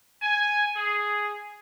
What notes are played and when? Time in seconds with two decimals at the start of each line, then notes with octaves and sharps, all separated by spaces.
0.22 G#5
0.76 G#4